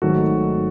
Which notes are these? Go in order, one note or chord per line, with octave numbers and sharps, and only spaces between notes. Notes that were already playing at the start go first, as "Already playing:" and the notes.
G#1 G#2 D#3 F#3 A3 F#4 A4